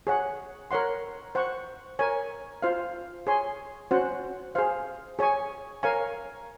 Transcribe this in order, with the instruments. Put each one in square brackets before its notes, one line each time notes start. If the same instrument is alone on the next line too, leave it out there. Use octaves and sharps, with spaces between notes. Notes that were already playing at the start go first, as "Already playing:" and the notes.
[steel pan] G#4 C#5 F#5
A#4 C#5 F#5 C6
C5 F#5 C#6
A#4 C#5 G#5
F4 C5 F5
G#4 C#5 G#5 C6
C#4 F#4 C5 F#5
G#4 C5 F5
G#4 C#5 G#5 C#6
A#4 C#5 F5 G#5 C#6